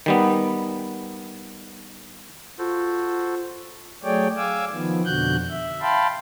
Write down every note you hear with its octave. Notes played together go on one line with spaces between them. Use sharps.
D#3 G3 B3
F4 F#4 A4 C5
F#3 A3 G#4 C#5 D5 G5
F5 G#5 D6 E6
D#3 F3 B3
F2 B2 D3 F#4 F#6 G6
E5
F5 G5 A5 B5 C6